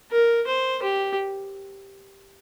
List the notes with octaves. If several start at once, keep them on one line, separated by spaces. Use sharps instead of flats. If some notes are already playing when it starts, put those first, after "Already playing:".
A#4
C5
G4